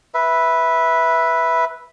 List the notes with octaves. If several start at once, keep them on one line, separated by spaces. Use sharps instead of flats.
B4 E5